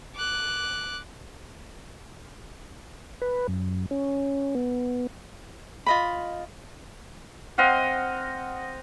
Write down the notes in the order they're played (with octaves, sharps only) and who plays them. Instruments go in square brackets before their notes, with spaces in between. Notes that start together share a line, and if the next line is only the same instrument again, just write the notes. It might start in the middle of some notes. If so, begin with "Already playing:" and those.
[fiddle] D6 F#6
[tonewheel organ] B4
F#2
C#4
B3
[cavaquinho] F4 D#5 B5
[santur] C4 D#5 F5 F#5